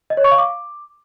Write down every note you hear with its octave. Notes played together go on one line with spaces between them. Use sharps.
D#5
C#5
C#6
F5
D6